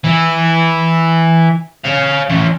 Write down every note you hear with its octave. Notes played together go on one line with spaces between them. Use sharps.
E3 E4
C#5 F5
E3 C#4